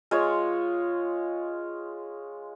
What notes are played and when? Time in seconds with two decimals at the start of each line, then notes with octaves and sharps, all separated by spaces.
0.11 G#3 F4 C#5